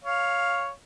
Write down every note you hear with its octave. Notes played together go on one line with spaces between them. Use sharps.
C#5 F5